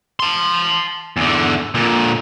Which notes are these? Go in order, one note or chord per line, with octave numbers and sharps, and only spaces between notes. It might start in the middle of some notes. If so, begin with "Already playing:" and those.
A5 C6
E2 D3
A#2 D3